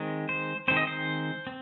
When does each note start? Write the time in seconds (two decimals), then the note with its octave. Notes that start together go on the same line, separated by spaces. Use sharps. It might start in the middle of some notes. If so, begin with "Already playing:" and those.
Already playing: D#3 G#3 C4
0.29 C5
0.68 D#3 G#3 C4 C5
0.77 D#5
0.87 C5
1.47 C4